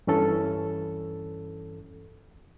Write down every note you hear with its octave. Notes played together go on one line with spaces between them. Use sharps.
G2 E3 C#4 A4